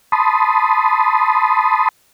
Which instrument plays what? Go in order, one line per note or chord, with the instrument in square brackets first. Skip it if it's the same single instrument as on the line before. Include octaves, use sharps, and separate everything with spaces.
[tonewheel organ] A5 B5 C6 D#6